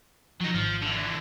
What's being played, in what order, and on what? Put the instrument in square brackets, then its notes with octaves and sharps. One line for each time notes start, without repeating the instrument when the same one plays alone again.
[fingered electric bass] F3 [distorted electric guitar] F#3 D#4
[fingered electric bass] G#1 [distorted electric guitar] F3
[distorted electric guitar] D3 E3